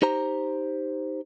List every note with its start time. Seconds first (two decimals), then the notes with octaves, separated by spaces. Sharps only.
0.02 D#4 G4 C5 A#5